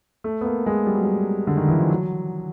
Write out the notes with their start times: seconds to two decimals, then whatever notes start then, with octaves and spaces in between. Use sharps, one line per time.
0.24 A3
0.41 B3
0.46 A#3
0.66 G#3
0.87 G3
0.95 F#3
1.04 G3
1.47 D3
1.57 D#3
1.68 E3
1.79 F3
1.90 F#3